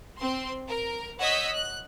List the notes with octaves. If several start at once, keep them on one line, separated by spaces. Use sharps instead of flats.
C4 C6
A#4
C#5 D#5 F#5 E6 G6 B6
F#6